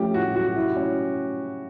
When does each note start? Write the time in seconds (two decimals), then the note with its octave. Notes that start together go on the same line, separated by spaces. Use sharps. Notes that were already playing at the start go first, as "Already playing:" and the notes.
Already playing: F3 A3 C#4 G4
0.14 A2 F#4
0.36 F#3 F#4
0.56 E4
0.76 C#4